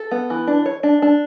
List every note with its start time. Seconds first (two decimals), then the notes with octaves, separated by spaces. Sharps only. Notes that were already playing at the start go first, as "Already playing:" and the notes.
Already playing: A4
0.11 B3
0.30 E3
0.47 D4
0.66 C#5
0.83 D4
1.02 D4